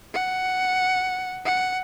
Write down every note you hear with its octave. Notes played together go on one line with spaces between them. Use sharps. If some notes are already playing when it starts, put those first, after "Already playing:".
F#5
F#5